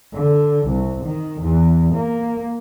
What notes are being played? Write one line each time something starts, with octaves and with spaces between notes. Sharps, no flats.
D3
C2
D#3
E2
A#3